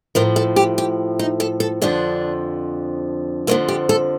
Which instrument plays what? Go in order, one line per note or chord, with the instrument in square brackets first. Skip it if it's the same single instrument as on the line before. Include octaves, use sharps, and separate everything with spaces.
[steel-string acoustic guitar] A2 F3 A#4
A4
G4
G4
D#4
A4
A4
F2 D3 F3 D4
F2 D3 F3 A#3
G4
A4